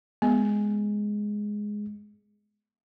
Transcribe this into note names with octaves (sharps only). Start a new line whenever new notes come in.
G#3 B3